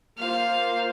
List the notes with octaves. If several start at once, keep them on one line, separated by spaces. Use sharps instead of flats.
A#3 F4 C5 F5